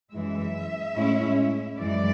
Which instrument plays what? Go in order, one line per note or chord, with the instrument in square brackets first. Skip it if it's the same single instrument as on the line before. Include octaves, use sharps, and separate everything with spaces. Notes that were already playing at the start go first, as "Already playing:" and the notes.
[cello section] F#2 E3 G#3 E5
A2 G#3 C#4 E4
F#2 E3 G#3 D5